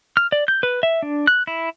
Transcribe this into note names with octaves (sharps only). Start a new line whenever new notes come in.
F6
D5
G6
B4
E5
D4
F#6
E4